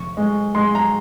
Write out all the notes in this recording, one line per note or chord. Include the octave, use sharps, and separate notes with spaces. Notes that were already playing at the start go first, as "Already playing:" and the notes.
Already playing: F1 C#6
G#3
G#3 C6
A#5